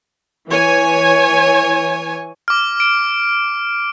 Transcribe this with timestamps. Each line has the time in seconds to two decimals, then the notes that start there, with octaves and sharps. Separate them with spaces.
0.48 E3 C#5 G#5
2.48 D6 F6
2.80 D7